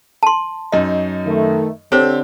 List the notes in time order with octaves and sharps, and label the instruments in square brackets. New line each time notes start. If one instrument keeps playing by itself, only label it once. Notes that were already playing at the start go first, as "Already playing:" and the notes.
[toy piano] A5 C6
[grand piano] F#2 D#4 [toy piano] D#5
[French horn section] D#3 A3
[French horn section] D3 [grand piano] C4 G4 A4 [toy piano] C5 C#5